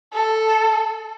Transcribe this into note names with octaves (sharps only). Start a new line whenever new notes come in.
A4